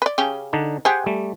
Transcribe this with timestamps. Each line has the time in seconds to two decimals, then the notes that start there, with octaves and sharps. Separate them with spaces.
0.02 B4 D5
0.18 C#3 C#4 G4
0.53 D3 D4 D#4
0.85 G4 G#4 C5 F#5 G5
1.06 G3 A3